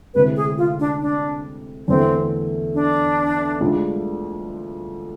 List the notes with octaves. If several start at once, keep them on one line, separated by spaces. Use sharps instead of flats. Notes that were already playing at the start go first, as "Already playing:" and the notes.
D2 C3 G#3 C4 E4 B4
G#4
F4
D4
D4
E2 D3 A3 C4
D4
D2 D3 G#3 D4 F4